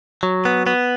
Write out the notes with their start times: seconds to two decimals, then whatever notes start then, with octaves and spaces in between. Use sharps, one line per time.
0.23 F#3
0.45 B3
0.67 B3